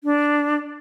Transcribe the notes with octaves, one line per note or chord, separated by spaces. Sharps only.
D4